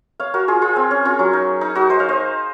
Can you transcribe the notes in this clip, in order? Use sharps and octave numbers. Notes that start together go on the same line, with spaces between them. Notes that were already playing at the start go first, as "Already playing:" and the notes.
C#5 F5
F#4 A#4
F4 G#4
F4 G#4
C4
C#4
C#4 F4
F#3
D#4
D#4
D#4 F#4
C5 D#5
C#5 F5
C5 D#5